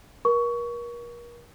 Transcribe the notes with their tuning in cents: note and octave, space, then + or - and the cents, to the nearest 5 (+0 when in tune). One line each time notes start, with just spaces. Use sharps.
A#4 +35 C#6 +20